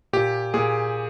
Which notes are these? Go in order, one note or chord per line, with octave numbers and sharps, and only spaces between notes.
A#2 G4
A#2 G#4